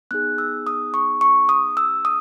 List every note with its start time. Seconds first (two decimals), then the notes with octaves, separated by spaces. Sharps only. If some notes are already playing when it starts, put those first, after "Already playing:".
0.11 B3 D#4 G#4 F#6
0.38 E6
0.67 D#6
0.94 C#6
1.21 C#6
1.49 D#6
1.77 E6
2.05 D#6